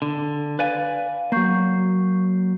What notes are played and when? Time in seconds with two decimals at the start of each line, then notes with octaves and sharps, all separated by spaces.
0.02 D3
0.59 B4 D5 F5 G#5
1.32 F#3 A#3 C#6 G6 C7